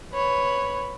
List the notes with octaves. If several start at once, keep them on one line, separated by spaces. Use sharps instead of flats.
B4 C#5 B5